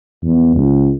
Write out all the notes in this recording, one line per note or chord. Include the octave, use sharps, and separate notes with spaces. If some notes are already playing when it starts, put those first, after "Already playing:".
E2
C#2